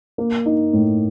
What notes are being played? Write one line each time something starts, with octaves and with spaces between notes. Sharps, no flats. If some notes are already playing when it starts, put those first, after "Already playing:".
A#3
D#4
A2